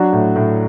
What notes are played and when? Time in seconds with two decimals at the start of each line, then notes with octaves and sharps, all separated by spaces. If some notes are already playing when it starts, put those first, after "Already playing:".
Already playing: F#3 D4 F#4
0.13 A2
0.36 A2